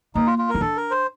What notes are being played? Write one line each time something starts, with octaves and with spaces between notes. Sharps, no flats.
A#3 D#4
F4
F4
A#4
D#4
D4 A4
A#4
C5